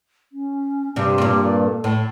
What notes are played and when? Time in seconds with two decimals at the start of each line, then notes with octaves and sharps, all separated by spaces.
0.33 C#4
0.96 G2 C3 G4
1.18 G2 A#2
1.45 D5
1.65 A4
1.84 A2